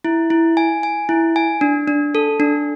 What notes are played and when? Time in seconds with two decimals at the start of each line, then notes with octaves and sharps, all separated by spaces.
0.05 E4
0.30 E4
0.57 G#5
0.83 G#5
1.09 E4
1.36 G#5
1.61 D4
1.88 D4
2.15 A4
2.40 D4